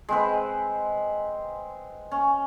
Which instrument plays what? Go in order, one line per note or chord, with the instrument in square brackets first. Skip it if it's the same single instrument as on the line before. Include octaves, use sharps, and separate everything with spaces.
[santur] G#3 C4 B4
C#4